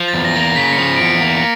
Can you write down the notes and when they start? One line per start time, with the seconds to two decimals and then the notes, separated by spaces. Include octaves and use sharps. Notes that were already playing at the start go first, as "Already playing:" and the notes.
Already playing: F3
0.08 A6
0.14 E2
0.25 A#6
0.35 A#3
0.41 A#6
0.56 C#3 B6
0.73 F3 C#7
0.96 E2 D7
1.05 C#7
1.21 A#3